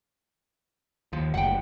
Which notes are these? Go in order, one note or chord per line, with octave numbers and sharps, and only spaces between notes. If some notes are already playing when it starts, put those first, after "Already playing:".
D#2 F3
F#1 D2 F#5 G5